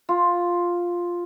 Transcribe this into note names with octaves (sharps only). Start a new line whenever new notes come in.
F4